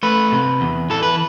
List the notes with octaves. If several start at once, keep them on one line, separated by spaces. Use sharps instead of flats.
A3 B4
C3
E2
E3 A4
B4